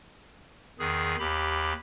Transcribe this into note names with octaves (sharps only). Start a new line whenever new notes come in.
E2 D#3 G#4
D#2 G4 B5